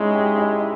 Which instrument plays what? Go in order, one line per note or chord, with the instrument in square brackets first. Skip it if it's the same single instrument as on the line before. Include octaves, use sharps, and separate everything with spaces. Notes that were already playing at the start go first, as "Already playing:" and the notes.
Already playing: [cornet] G#3 [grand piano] C#4 D#4 E4
[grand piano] G4
E4